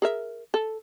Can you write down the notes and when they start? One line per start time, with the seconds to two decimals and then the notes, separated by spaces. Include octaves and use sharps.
0.02 G#4 A#4 E5
0.54 A4